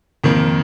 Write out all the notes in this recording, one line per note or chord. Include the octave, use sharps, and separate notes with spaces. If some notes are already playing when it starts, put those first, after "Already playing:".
F2 D#3 A#3